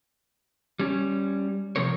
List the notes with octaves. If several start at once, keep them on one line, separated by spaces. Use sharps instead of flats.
G3 C#4
C3 F3 C4 A#4 C#5